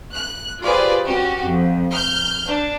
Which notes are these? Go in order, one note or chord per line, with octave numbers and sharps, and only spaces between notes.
F#6
F4 G4 G#4 B4 C5 D5
C#4 F#4 G4
F2
F6 G6
D4